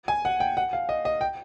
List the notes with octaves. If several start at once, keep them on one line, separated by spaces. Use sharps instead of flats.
G#5
F#5
G5
F#5
F5
D#5
D#5
G5